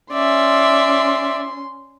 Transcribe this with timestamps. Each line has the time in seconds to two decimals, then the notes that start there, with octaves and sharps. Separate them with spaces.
0.13 C#4 D5 E5 C6